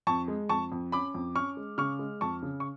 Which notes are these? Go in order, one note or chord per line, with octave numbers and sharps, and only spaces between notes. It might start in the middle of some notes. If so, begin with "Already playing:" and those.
F2 A5 C#6
G#3
F2 A5 C#6
F2
C#4 B5 D6
F2
C#4 C#6 F6
G#3
C#3 C#6 F6
G#3
F2 A5 C#6
C#3
C#6